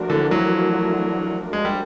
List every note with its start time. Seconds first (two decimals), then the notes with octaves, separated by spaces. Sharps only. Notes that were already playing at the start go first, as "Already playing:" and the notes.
Already playing: F3 A3 D4 F#4 A#4
0.10 D3 E3
0.31 E3 F#3
1.53 G#3
1.65 G3